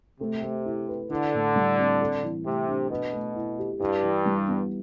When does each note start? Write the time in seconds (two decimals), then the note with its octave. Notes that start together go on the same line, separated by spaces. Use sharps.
0.20 C3 A3
0.43 A3
0.66 E4
0.88 B4
1.10 D3 E4
1.34 A2
1.56 G3
1.78 C4
2.01 A4
2.23 E3
2.45 C3 A3
2.68 D4
2.90 B2 B4
3.13 A3
3.36 E4
3.58 G4
3.80 G2 E4
4.03 E3
4.26 G3
4.48 B3